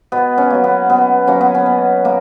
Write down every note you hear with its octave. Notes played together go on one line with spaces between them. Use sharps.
B2 B3
C#4
F#3 A#3
B3
B2 B3
F#3 A#3 C#4
B3
C#4
B2
A#3